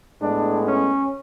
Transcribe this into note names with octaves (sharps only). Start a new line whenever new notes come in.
A2 G#3 B3 D4
C#4